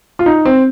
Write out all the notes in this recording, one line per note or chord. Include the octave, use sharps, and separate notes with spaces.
F4
D#4
C4